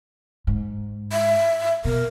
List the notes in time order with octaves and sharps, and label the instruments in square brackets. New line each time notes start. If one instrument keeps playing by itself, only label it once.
[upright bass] G#2
[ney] E5
[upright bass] B2 [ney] A#4